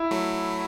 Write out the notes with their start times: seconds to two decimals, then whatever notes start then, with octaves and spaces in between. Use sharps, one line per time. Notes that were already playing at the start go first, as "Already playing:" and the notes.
Already playing: E4
0.11 F#3 A3